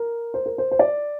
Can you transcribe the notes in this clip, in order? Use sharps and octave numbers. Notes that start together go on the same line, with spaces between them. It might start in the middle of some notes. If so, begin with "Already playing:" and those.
Already playing: A#4
C5
A#4
C5
C5
D5